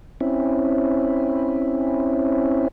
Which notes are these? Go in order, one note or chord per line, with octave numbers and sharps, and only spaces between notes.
C4 C#4 E4